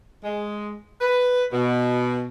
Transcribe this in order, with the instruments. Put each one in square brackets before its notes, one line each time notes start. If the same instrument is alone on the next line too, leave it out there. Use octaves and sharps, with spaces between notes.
[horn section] G#3
B4
B2